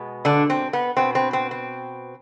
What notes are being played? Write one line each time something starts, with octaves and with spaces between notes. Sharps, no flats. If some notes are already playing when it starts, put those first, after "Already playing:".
Already playing: B2 G#3 B3
D3 D4
C4
B3
B2 B3 C4
C4
C4
C4